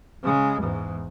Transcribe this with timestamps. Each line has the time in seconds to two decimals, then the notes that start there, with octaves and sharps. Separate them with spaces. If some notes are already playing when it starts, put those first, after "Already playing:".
0.23 C#3 G#3
0.62 E2 G#2